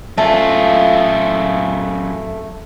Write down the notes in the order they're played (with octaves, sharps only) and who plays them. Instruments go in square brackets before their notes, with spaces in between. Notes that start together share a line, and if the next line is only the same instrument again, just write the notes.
[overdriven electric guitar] F#2 F4 [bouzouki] A3